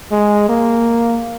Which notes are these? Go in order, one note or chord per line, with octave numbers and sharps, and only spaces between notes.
G#3
A#3